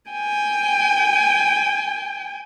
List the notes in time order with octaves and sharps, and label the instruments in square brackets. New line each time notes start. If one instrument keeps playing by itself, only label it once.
[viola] G5 G#5